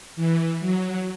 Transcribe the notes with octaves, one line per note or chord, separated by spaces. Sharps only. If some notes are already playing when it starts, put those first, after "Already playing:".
E3
F#3